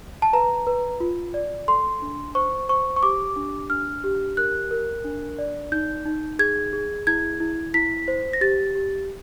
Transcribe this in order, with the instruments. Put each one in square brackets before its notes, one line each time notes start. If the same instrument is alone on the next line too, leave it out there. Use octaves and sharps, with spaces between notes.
[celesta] A5
B4 A#5
B4
F4
D5
A4 C6
D4
C5 C#6
C5 C#6
C#6
G4 D6
D4
D4 F6
G4
A#4 F#6
A#4
D4
D5
D#4 G6
D#4
G#4 G#6
G#4
E4 G#6
E4
E4 B6
C5
A#6
G4 A6
G4